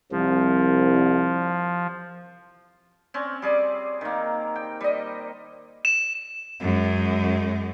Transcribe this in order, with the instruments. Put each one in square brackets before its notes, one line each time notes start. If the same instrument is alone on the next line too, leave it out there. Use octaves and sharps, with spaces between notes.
[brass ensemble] C2 [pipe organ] F3
[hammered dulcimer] C4 C#4
G3 G#4 D5
D#3 A#3
G5
G3 D#5
[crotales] E7
[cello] F#2 G#3